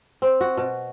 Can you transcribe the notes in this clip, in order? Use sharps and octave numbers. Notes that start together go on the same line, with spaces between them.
C4
F#4
B2